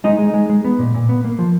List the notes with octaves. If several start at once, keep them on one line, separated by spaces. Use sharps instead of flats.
G#3 D#4 D#5
G#3
G#3
G#3
B3
A#2
A#2
B3
A#3
F3